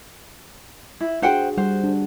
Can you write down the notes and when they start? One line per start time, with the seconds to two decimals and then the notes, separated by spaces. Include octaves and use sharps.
1.00 E4
1.22 D4 F#4 G#4 C5 F#5 G5
1.57 G3 C5 F#5
1.84 D4